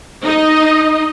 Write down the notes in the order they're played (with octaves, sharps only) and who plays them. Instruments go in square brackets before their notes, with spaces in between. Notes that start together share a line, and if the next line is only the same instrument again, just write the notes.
[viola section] D#4 D#5